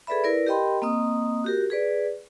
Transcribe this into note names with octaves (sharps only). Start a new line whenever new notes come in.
G#4 A4 B4 D5 E5 B5
E4 A#4 B4 D5
G4 A#4 D#5 G5 B5 C6
A#3 C4 D#5 D#6
F#4 G4 A#4
G#4 B4 D5